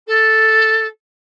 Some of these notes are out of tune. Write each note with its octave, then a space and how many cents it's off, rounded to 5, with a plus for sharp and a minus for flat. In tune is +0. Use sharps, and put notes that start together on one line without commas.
A4 +0